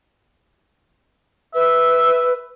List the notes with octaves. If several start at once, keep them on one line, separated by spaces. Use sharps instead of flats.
B4 E5